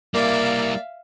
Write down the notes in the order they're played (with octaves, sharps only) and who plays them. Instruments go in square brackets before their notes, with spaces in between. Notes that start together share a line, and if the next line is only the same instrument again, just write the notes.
[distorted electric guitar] G3 E4 [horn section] A#3 [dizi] D5 [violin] E5 F5